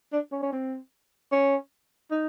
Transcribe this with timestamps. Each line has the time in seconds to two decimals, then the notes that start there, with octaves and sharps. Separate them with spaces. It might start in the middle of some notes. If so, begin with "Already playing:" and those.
0.13 D4
0.32 C#4
0.43 C#4
0.53 C4
1.32 C#4
2.11 D#4